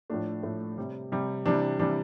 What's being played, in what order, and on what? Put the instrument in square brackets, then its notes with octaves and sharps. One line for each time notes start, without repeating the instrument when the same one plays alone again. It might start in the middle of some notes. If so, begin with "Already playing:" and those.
[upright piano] A2 F3 A3 D4
A2 F3 A3
C3 G3
C3 G3
C3 E3 G3 D4
C3 E3 G3 D4